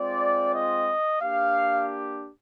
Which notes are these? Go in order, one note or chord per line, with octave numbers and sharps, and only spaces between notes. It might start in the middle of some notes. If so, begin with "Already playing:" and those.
Already playing: G#3 C4 F4 D5
D#5
A#3 D4 G4 F5